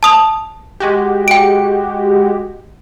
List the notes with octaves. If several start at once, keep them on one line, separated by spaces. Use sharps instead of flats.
A5 D#6 F7
G#3 F#4 G4
G5 D7